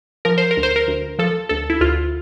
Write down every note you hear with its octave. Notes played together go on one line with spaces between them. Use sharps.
F3 A#4
C5
A#4
D2
C5
A#4
D2
F3 A4
D2 A4
E4
D2 F4